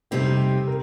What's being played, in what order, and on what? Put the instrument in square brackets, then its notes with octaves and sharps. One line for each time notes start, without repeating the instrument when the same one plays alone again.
[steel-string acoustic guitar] F2 C3 G3 C4 D#4 [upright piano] G4
[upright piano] A#4